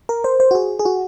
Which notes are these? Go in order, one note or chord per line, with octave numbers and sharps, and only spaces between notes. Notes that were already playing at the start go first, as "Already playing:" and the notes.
A#4
C5
C5
F#4
G#4
G#4
F#4